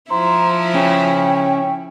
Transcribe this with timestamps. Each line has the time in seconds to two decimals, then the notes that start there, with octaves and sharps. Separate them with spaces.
0.10 F3 E4 C5 A#5
0.74 C#3 C#4 G5